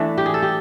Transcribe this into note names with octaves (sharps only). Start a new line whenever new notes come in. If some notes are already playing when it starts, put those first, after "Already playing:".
Already playing: E3 A3 D4
G4
G#4
A4
G4